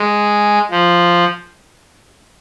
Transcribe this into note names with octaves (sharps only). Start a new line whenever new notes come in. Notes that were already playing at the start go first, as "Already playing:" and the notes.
Already playing: G#3
F3